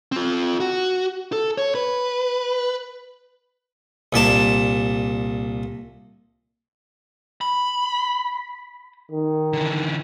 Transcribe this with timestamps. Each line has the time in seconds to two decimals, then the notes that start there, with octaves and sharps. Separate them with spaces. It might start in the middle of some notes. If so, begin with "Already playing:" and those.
0.12 C4 F4
0.60 F#4
1.32 A4
1.58 C#5
1.75 B4
4.13 C2 A#2 D5 A5
7.41 B5
9.11 D#3
9.53 D3 E3